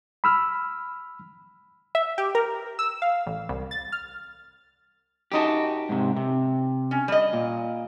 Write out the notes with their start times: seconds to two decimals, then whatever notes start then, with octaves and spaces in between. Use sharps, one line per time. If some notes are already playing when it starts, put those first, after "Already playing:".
0.24 B5 E6 F6
1.95 E5
2.18 G4
2.35 A#4
2.79 E6
3.02 F5
3.26 A1
3.49 C2
3.71 A6
3.92 F6
5.32 F#2 D#4 F#4 G4 A5
5.89 G#2 C3
6.16 C3
6.91 C#4
7.08 G3 D#5
7.33 A#2